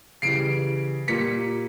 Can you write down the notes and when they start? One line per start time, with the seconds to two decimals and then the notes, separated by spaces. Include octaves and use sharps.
0.22 C#3 E3 G3 C7 D7
1.08 A#2 G3 A#3 B6 C#7